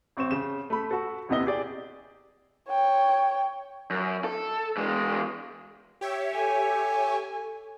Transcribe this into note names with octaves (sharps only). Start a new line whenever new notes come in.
A1 C4 C#6 E7
C#3 E7
A3 B5
F#4 A4
D#2 C3 B3 E4 D#5 G7
G4 G#4 D5
C#5 G5
F#2
A4
E2 G#3
G4 C#5 E5
A4 G#5